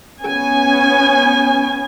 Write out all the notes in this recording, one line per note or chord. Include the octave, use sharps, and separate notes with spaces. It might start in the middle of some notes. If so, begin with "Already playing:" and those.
B3 C#4 G#5